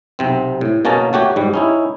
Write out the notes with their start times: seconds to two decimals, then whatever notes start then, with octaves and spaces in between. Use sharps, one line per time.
0.19 B1 C3 C4
0.61 A2
0.85 B2 A#3 C#4 G#4 A5 A#5
1.13 A3 F#4 G4 C#5
1.36 G#2 G3
1.54 C#4 D#4 E4